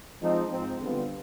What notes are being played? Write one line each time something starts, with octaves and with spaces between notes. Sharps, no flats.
F3 G#3 C4 D#4
G#2 F3 C4
D3 G3 B3 F4